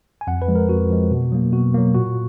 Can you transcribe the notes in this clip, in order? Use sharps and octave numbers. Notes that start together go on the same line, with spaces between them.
G#5
F2 F#5
B4
F3 G#3
A#4
F2 F#4
F3 G#3
B2
F#3 A#3
B2 F#4
F#3 A#3
A#2 F#4